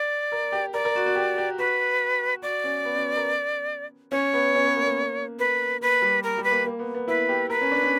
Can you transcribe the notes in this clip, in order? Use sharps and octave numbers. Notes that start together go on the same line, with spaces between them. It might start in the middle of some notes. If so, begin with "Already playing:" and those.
Already playing: D5
A#4
G4
A#4 D5
A#4
F#4
F#4
G4
G4
F#4 B4
F#4 D5
C#4
B3
C#4
A#4
C#4 C#5
B3
C#4
B3
A#3
A#3
A#3 B4
A#3 B4
G3
A#4
G3
B4
A#3
A#3
B3
B3
E4 B4
G4
A#4 B4
C#4
D4
C#4